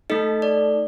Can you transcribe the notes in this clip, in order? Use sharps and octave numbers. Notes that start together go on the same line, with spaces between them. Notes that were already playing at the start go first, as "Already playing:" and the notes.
A3 D#4 A4 D#5
D5